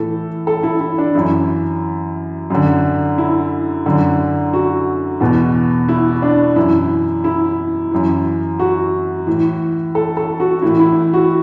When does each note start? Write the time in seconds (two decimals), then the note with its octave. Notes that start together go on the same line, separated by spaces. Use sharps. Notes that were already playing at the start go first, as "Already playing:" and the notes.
Already playing: A2 E3 A4
0.47 A4
0.63 E4
0.80 E4
0.98 D4
1.15 F#2 E3 E4
2.50 F#2 D3
3.18 E4
3.86 F#2 D3
4.53 F#4
5.20 E2 B2
5.89 E4
6.22 D4
6.56 F#2 E3 E4
7.24 E4
7.91 F#2 E3
8.59 F#4
9.27 A2 E3
9.95 A4
10.17 A4
10.40 F#4
10.62 A2 E3 E4
10.80 E4
11.14 F#4